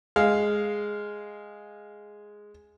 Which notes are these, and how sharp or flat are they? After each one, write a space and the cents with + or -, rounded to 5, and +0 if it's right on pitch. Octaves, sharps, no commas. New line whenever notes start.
G#3 +0 F5 +0